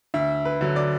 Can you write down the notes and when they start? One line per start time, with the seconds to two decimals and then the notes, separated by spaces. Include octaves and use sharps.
0.14 D2 E5
0.45 B4
0.61 D3 F#3
0.76 D5